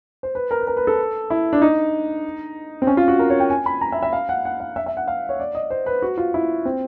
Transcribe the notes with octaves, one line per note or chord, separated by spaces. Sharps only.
C5
B4
A#4
B4
A#4
B4
A4
E4
D4
D#4
C4
C#4
F4
F#4
A#4
C#5
G5
G#5
B5
A#5
E5
E5
F5
F#5
F#5
F5
E5
E5
F#5
F5
C#5
D5
D#5
C5
B4
F#4
F4
E4
C4